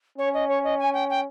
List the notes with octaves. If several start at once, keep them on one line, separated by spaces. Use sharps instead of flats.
C#4 C#5
D#5
C#5
D#5
G#5
G5
G5